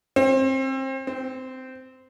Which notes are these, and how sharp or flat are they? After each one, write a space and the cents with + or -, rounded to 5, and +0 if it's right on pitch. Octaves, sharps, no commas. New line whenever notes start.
C4 +30
C4 -15